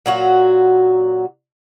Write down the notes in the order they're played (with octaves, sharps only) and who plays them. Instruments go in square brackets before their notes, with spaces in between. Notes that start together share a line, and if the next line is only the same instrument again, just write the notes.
[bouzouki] A#2 F#3 F#4